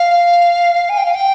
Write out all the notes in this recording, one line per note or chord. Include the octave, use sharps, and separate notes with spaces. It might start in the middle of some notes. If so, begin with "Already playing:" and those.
Already playing: F5
G#5
G5
F5
G5